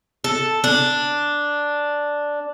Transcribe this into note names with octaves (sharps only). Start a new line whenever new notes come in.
A4
D4